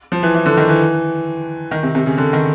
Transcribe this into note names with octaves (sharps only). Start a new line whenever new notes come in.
F3
E3
E3
D3
D#3
E3
D#3
C3
C3
C#3
D3
D#3